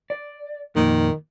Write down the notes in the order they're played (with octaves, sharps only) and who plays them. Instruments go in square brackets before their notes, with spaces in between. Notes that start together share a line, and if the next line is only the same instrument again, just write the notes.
[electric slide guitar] D5
[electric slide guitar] F2 A#2 A#3 [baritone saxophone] D#3